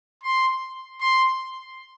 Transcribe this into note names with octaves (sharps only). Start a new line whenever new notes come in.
C6
C6